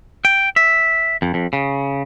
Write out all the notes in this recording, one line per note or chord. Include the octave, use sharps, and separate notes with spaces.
G5
E5
F2
F2
C#3